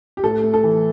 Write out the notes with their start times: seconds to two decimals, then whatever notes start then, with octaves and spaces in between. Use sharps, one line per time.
0.17 G4
0.24 A2 A4
0.43 A3
0.54 A4
0.63 E3